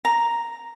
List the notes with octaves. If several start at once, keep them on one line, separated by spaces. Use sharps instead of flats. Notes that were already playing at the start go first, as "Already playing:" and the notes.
A#5